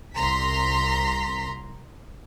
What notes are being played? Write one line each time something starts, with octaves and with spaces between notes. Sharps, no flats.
C2 A#5 C6 B6